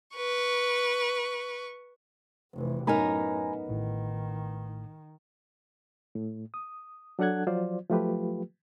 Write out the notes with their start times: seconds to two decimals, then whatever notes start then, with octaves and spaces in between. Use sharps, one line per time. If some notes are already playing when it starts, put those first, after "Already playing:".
0.16 B4 C#6
2.54 F1 E3
2.87 F#2 A2 B3 D#4 A#4 G#5 A#5 B5
3.69 A1 A2 D#3
6.15 A2
6.54 D#6
7.19 F#3 D4 A4 F#5 F#6 G#6
7.47 F3 F#3 F4 C5 D5
7.90 F3 F#3 A3 F4 G4 B4